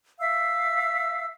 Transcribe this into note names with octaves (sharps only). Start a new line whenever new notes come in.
E5 F5 E6